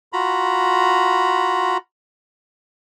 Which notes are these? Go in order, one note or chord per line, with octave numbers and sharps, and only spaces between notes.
F4 F#4 A#5 B5